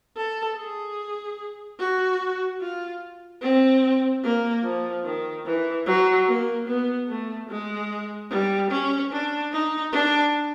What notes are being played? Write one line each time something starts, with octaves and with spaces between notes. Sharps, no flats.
A4
G#4
F#4
F4
C4
A#3
F3
D#3
E3
F#3
A#3
B3
A3
G#3
G3
C#4
D4
D#4
D4